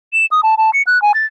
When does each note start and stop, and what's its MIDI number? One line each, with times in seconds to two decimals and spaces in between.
0.13 0.26 100
0.31 0.41 87
0.43 0.55 81
0.58 0.70 81
0.73 0.82 97
0.87 1.01 90
1.02 1.12 80
1.14 1.26 93